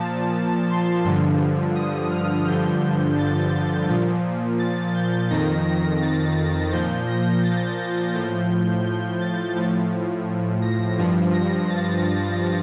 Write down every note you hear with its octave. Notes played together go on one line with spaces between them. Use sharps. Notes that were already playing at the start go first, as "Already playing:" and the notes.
Already playing: A#2 F3 A5
C6
G2 D3 F3
D#6
F6
G2 D3 F3 G6
A6
A6
A#2 F3
A6
G6
F2 D#3 A#6
A#6
A6
A#2 F3 G6
A#6
A6
A2 F3 G6
G6
A6
A2 F3
A#6
G2 F3
A#6
A6